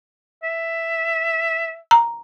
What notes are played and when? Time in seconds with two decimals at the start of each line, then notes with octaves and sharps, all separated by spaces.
0.44 E5
1.91 A#5